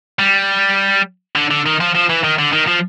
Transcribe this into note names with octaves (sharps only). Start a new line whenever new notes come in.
G3
D3
D3
D#3
F3
F3
E3
D#3
D3
D#3
F3